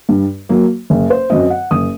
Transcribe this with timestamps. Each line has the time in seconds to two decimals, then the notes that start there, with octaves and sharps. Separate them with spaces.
0.09 G2
0.49 F#3 A#3
0.90 F#1
1.10 C5
1.30 F#2 F#3 C4 D#5
1.50 F#5
1.71 F#1 D#6